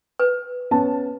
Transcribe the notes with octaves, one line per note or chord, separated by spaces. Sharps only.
B4
B3 C#4 A5